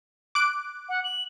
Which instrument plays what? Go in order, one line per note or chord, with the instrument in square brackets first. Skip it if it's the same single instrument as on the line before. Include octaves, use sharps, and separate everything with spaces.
[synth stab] D6 F#6 D7
[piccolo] F#5
F#7